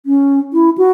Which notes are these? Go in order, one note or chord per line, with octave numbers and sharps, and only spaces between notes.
C#4
E4
F#4